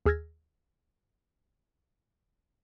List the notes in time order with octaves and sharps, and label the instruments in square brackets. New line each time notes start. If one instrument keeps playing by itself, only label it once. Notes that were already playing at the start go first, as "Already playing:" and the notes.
[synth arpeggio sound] D#2 G#4 E6 F6 G#6 A#6